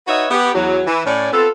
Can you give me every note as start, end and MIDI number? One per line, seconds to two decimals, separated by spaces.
0.08 0.27 63
0.08 0.27 66
0.08 0.27 71
0.08 0.27 73
0.08 0.27 75
0.08 0.27 76
0.31 0.50 59
0.31 0.50 67
0.55 0.81 40
0.55 0.81 54
0.87 1.03 52
1.06 1.29 45
1.06 1.29 61
1.06 1.29 74
1.33 1.48 59
1.33 1.48 60
1.33 1.48 65
1.33 1.48 69